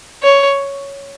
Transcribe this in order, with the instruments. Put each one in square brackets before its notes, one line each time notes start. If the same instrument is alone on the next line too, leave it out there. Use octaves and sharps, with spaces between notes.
[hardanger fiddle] C#5